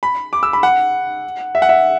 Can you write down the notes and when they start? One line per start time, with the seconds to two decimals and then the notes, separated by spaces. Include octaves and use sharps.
0.03 B5
0.33 D6
0.43 E6
0.53 B5
0.63 F#5
1.55 E5
1.62 F#5
1.69 E5